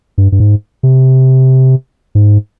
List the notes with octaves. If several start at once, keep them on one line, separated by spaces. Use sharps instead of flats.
G2
G2
G#2
C3
G#2